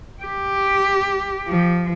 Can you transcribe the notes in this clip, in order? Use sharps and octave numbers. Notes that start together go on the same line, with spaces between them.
G4
F3